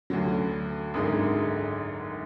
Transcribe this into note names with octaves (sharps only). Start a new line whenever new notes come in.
D2 D3 F#3
G#1 F#2 D3 G#3 D#4